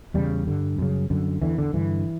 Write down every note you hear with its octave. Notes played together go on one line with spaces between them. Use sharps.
E2 C#3 G3
G2 D3
F#2 C#3
F#2 D3
E2 D3 E3
D3
G2 D3 E3